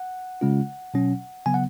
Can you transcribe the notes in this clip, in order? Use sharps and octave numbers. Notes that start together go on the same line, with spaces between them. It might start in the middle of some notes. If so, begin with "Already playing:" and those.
Already playing: F#5
C#3 G#3 C#4 F4
B2 F#3 C#4
C#3 F#3 B3 G#5
F#5